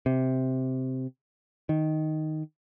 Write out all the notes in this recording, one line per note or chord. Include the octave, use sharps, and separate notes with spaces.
C3
D#3